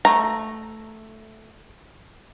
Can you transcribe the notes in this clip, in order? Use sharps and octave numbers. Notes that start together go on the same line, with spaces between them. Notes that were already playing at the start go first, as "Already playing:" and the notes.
A3 A#5